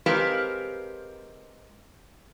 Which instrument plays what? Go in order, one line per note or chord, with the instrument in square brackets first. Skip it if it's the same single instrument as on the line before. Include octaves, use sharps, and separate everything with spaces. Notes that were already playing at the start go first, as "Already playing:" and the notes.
[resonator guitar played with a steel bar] G#3 C4 G4 A#4 B4 F5